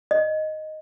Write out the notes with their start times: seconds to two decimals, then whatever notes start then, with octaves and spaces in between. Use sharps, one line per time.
0.11 D#5